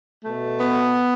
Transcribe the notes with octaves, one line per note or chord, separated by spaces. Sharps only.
B2 A3
B3